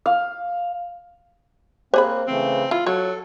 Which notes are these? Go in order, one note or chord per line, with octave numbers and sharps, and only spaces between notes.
F5
A#3 C4 G4 G#4 C5 B5
C#3 E3 A3 C4
E4 F4
F#3 A4 C#5